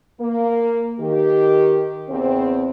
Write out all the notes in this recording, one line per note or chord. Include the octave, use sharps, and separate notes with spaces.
A#3
D#3 G4
E2 C#3 B3 C4